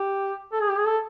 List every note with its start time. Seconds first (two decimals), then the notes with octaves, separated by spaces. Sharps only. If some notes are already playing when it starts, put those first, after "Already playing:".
Already playing: G4
0.53 A4
0.61 G#4
0.70 G4
0.78 G#4
0.86 A4